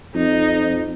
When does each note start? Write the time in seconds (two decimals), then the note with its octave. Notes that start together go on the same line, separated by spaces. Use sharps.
0.15 F2 D#4